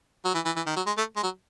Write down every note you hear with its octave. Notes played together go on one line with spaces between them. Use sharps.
F#3
E3
E3
E3
D#3
F#3
G#3
A3
G#3
F#3